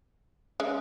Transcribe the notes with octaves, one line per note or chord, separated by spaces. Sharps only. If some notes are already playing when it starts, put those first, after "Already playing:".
G#3 C#4